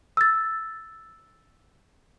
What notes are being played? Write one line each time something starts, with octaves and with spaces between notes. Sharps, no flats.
E6 A6